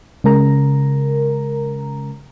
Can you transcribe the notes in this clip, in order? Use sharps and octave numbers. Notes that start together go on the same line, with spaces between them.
C#3 G#3 A#4 A#5